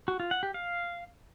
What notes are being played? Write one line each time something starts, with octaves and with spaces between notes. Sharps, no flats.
F#4
F4
F#5
G4
F5